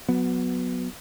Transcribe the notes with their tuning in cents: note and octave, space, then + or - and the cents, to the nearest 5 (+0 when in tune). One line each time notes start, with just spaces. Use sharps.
F#3 -15 B3 +5